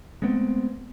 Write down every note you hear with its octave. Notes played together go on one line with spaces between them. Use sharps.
G#3 A3 B3 C4